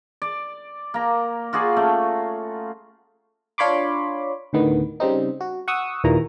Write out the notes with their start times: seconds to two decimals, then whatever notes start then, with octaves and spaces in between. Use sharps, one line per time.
0.22 D5
0.94 A#3 A#5
1.53 F4 F#4 G#4 D5
1.76 A3 C#4
3.58 D4 F4 C#5 B5 C6 D6
4.53 D2 A2 D3 D#3 B3
5.00 C#3 G3 C4 D#4
5.41 F#4
5.68 F#5 C#6 D#6 E6
6.04 D#2 A#2 E3 A#5